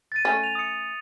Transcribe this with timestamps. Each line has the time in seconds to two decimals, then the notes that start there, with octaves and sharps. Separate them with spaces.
0.12 A6 D#7
0.25 A3 C#4
0.43 F7
0.55 D#6 C#7